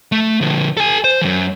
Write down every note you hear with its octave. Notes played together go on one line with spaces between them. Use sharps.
A3
D3 F3
A4 G#5
C5
F#2 E3